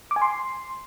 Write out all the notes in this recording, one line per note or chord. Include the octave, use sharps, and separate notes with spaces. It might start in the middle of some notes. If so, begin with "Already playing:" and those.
D6
G#5
C6